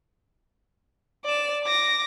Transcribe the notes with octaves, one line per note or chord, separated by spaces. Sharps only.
D5 E7
D6 A#6